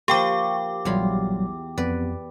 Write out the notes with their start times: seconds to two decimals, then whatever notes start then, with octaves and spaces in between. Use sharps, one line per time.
0.08 F3 A#3 G4 G5 C#6 D6
0.85 A#1 E2 F#3 G3 F4 B5
1.78 F2 B3 B4 D5